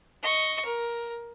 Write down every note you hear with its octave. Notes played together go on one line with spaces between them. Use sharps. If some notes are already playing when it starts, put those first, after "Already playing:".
D#5 C#6
A#4